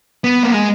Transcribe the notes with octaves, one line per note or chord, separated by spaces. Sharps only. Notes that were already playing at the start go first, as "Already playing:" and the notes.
B3
A#3
G#3